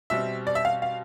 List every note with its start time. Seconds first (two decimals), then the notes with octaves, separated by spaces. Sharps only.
0.10 B2 G3 C4 E5
0.47 D5
0.55 E5
0.65 F5
0.82 F5